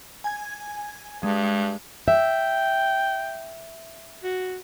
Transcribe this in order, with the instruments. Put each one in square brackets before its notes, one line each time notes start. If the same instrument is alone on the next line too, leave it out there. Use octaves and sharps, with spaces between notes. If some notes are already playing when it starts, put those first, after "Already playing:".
[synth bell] G#5 G#6
[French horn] G2 [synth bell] G#3
[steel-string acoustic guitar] E5 [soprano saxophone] G5
[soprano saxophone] F#4